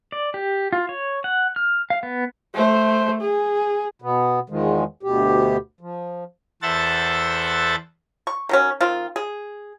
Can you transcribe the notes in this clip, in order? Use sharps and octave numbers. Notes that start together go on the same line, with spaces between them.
D5
G4
F4
C#5
F#5
F6
F5
B3
A3 C5
G#4
B2 B3
E2 D#3 F3 G#3
D2 B2 G4
F3
E2 A4 C5 E5 F#5 A6
C#6
D#3 F#3 C#4
D#3 C4 F4
G#4